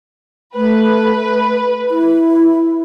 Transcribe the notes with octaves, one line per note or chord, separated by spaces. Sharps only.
A3 B4
E4